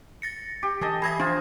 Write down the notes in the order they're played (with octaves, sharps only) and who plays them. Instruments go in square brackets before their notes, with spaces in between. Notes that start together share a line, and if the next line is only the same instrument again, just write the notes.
[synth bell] A6 A#6 C#7
[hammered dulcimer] G4
[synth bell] E3 [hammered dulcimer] G#4 A4 D#5
[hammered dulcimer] G#4 E5 [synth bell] B5 G#6 A#6
[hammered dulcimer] F3 F4 [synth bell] D4